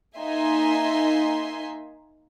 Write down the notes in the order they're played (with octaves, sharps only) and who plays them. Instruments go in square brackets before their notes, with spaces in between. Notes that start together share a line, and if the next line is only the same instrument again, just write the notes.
[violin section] A#3 D#4 E5 G#5 C6